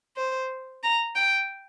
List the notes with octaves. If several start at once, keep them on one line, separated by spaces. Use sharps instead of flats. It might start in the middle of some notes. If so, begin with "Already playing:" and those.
C5
A#5
G5